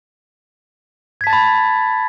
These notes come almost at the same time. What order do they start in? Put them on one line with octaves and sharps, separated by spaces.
G#6 B6 A5 A6 B5